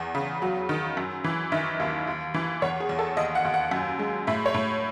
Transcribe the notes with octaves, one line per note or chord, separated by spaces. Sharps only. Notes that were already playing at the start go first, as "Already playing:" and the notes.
Already playing: E2
C#3
F#3
D#3
F#2
E3
D#3 E5
D#2
D#2
E3
E2 C#5
G#4
E2
A4
D#2 D#5
F#5
D#2
F#5
F#2
G#3
A2 E5
C#5
A2